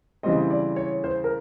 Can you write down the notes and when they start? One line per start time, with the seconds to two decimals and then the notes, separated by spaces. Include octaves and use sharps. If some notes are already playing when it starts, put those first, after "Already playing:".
0.23 C#3 E3 G3 C4 D#5
0.51 D5
0.76 C#5
1.04 C5
1.24 A#4